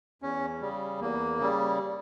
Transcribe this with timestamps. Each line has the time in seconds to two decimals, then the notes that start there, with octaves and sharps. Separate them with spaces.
0.22 E2 C#4
0.61 C#3 G3
1.00 E2 A#3
1.39 C#3 G3